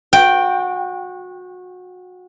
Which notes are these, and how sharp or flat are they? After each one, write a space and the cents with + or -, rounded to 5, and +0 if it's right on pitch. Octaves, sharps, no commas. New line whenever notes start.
F#4 -25 G5 +0